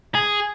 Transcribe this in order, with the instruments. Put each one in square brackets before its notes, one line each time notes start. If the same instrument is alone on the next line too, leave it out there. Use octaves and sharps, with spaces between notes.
[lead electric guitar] G#4